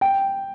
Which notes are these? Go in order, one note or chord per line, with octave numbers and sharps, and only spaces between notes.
G5